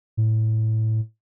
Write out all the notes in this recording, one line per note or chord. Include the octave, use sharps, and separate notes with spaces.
A2